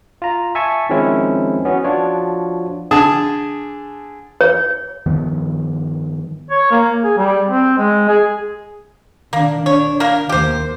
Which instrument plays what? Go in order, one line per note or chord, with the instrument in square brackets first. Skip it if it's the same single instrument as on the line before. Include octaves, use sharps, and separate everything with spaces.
[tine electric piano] F4 A#5
E5 G#5 A5 C#6
D#3 F3 G#3 C4 C#4 E4
B3 C#4 F#4
F3 D4 F4 F#4 C#5
[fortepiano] D3 G#4 A5 D#6
[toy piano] C#5
[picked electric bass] G2 D#3 F3 B3
[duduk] C#5
A#3
G#4
G3
C4
G#3
G#4
[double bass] D#3 D4 [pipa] A#3
[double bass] D4 [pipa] C#5
[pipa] A#3 A#4
[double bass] D#2 A#3 [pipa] G4 C5